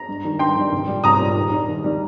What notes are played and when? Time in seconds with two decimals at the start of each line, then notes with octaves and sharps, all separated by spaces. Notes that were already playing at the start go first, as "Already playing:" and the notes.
Already playing: A#5
0.09 G2
0.24 D#3 G3
0.39 G2 G5 C6
0.57 D#3 G3
0.72 C2
0.87 A#2 G3
1.04 C2 A#5 D#6
1.19 A#2 G3
1.36 D#2
1.51 D#3 G3
1.69 D#2
1.84 D#3 G3